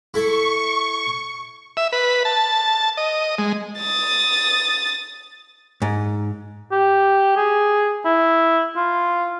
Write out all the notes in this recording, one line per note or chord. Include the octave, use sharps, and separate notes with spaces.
E4 A4 E5 C#6
E5
B4
A5
D#5
G#3
D#6 A6
G#2
G4
G#4
E4
F4